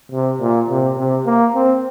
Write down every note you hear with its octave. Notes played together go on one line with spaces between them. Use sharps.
C3
A#2
C3
C3
A#3
C4